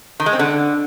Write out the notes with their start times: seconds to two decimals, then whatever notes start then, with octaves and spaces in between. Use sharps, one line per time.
0.20 D#3
0.26 G#3
0.33 C4
0.39 D3